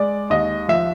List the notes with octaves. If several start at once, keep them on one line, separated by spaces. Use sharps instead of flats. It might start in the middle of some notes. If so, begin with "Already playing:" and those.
Already playing: G#3 D5
D#2 D#5
F3 E5